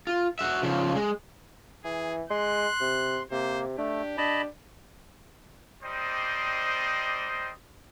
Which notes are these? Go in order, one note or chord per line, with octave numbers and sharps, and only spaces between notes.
F4
F#4 E5
C#3 F3
G#3
E3 G#4
G#3 C6 F#6
C3
C3 A#3 C5
A3 D4 G4
D4 D#5 A5 B5
G3 C4 D#4 C5 D5 D#5